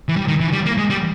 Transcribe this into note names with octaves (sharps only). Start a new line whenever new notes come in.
E3
G3
D#3
E3
G3
A#3
G#3
G3